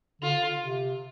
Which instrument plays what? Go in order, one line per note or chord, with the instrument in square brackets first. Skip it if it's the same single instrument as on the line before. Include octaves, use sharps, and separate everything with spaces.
[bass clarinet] D3 [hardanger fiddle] F4
[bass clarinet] C3